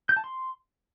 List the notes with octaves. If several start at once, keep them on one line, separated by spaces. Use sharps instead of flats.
G6
A5
C6